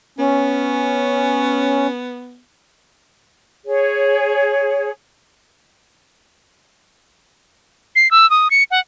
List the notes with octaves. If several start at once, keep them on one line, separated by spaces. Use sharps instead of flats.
B3 C#4
G#4 C#5
C7
E6
D#6
C#7
F#5